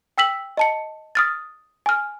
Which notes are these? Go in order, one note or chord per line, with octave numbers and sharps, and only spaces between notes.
G5 E6 B6 F#7
D#5 A5 C#7
D#6 F6 A6
G#5 F6